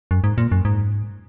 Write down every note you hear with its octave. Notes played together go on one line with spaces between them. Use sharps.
F#2
G#2
A#2
F#2
G#2